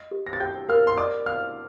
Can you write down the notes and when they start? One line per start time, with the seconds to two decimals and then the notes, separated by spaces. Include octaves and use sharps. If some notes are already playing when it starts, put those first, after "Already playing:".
Already playing: D#5
0.11 G4
0.26 A#6
0.33 A6
0.40 G4 G5 G6
0.69 A#4 F5 F6
0.87 C6
0.97 D5 D#5 D6
1.26 F5 A#5 F6